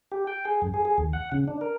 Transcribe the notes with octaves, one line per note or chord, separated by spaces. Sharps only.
G4
G5
G#4
F#2
G#4
G#4
D#2
F#5
C#3
D4
A#4